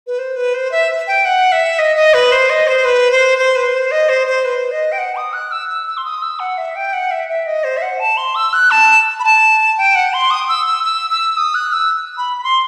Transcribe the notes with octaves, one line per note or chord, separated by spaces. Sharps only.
B4
C5
B4
C5
E5
G5
F#5
E5
D#5
D#5
B4
C5
D#5
C5
B4
C5
C5
B4
C5
D#5
C5
C5
B4
D#5
G5
F#5
D#6
F#6
E6
E6
E6
C6
D#6
E6
F#5
E5
G5
F#5
E5
E5
D#5
C5
E5
F#5
A5
C6
E6
F#6
A5
B5
A5
G5
F#5
C6
D#6
E6
E6
E6
E6
D#6
F#6
E6
B5
B5
C6